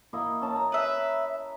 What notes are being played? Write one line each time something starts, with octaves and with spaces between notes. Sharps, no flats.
A#3 E4 D#5
C#4 A5
A#5
B4 E5